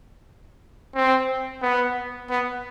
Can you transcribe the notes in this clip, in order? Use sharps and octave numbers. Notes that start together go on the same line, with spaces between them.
C4
B3
B3